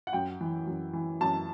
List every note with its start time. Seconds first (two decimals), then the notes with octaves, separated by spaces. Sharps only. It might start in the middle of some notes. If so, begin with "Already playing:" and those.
0.07 F#5
0.13 F#2 G5
0.41 E3
0.67 F#2
0.93 E3
1.21 F#2 A5